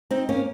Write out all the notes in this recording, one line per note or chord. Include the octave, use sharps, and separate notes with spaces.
C4 D#4
A#3 C#4